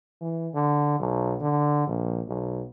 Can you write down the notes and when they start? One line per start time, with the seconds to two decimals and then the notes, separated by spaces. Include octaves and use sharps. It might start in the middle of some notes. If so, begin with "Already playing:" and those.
0.21 E3
0.54 D3
1.00 B1
1.41 D3
1.87 A#1
2.27 B1